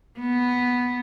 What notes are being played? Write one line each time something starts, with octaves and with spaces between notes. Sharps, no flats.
B3